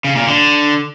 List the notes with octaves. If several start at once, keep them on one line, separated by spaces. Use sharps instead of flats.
C#3
A#2
D3